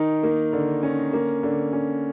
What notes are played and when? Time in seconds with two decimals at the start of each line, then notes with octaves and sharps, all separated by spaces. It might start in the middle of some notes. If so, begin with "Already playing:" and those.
Already playing: D#3 D#4
0.23 A#3
0.53 D3
0.83 C#4
1.13 A#3
1.43 D3
1.73 C#4